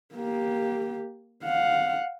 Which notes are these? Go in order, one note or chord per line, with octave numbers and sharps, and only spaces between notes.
A#3 G4
F5 F#5